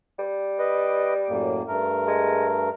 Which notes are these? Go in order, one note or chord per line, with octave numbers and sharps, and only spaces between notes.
G3
B4 D#5
F#2 A2 A#3
G2 A3 A#4
G#3